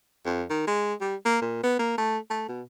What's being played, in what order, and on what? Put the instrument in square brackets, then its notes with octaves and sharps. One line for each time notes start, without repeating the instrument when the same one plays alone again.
[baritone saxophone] F2
D#3
G#3
G3
A#3
A#2
B3
A#3
A3
A3
B2